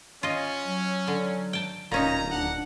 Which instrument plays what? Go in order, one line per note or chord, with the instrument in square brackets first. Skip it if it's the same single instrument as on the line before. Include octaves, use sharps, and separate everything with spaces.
[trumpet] C#4 [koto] F4 D#5
[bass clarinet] F#3
[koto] D3
G5 A5
[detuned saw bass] D1 [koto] A#2 C#4 D#4 [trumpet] A#5
[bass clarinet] D4 [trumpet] F#5